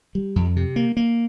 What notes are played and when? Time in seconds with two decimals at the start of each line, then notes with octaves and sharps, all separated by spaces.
0.15 G3
0.36 F2
0.56 C3
0.76 A#3
0.97 A#3